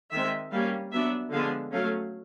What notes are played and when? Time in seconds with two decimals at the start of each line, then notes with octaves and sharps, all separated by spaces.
0.12 D#3 G#3 C4 E5
0.51 G3 A#3 C#4 F5
0.91 F#3 B3 D4 E5
1.31 D3 F3 G#3 B3 D4 F5
1.72 F#3 A3 C#4 F5